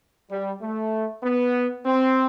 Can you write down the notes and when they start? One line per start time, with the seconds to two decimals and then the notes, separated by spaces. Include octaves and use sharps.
0.31 G3
0.61 A3
1.24 B3
1.85 C4